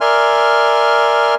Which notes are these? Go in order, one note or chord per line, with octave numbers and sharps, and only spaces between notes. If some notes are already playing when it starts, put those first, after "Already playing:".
A#4 D5 E5 G#5 C6 F6